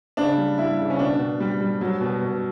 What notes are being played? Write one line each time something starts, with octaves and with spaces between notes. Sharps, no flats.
C#3 D4
G3
G3 E4
C#3
C#4
B2 D4
B2
G3
G3
F#3
B2
B2